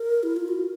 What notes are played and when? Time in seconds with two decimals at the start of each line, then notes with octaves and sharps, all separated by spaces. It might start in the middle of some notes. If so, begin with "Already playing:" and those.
Already playing: A#4
0.23 E4
0.36 F4
0.48 F#4